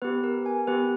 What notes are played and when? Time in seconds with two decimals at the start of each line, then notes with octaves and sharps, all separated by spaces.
0.02 B3 G4 B4
0.24 A#4
0.46 G#5
0.67 B3 G4 B4